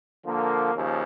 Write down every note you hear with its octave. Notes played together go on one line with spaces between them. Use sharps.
D3 F3 A#3
D#2 C#3 F3